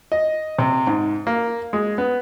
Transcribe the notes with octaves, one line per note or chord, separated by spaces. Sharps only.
D#5
C3
G#2
A#3
G#3
B3